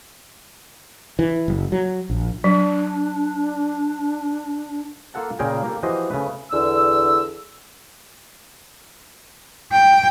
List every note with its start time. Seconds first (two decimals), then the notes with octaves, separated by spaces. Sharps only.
1.19 E3
1.48 F#1
1.72 F#3
2.10 A#1
2.44 F#3 D4
5.14 A#3 F4 A4 F#5 A5
5.39 A#2 C#3 G#4 A#4 G5 A#5
5.64 A#3 G4 A4
5.83 E3 F3 F#4 G4 C5 D#5
6.11 C#3 A3 B4
6.52 E2 D3 E6
9.72 G5